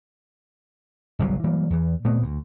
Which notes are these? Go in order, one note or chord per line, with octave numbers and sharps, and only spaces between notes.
G1 C2 C#3 F#3
E3 F#3 G3 A#3
E2 E3
A#2 A3 B3 C4
D2